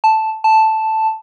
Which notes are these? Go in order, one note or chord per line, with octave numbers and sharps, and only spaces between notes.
A5
A5